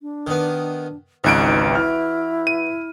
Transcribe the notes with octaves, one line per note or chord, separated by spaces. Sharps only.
D4
D#3 B3
G#1 C#2 E3 D#4 F#4 D7
E4 F6
D#7